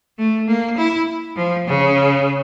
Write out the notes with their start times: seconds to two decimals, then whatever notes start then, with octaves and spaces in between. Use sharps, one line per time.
0.17 A3
0.48 A#3
0.77 E4
1.35 F3
1.66 C#3